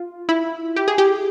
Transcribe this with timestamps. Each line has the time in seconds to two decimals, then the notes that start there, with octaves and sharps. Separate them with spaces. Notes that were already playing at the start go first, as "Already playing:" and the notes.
Already playing: F4
0.29 E4
0.76 G4
0.88 G#4
0.98 G4